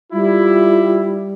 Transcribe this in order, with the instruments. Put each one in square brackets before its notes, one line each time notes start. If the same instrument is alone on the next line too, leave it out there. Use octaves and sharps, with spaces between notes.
[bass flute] G3 [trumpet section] E4 [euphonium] F4